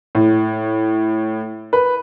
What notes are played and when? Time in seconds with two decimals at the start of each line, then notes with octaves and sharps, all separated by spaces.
0.15 A2
1.73 B4